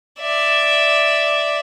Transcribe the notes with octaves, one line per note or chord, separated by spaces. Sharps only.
D5 E5